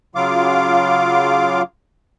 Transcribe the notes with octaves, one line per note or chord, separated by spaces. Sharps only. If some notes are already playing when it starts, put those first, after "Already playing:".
C#3 F#3 F4 F5 D6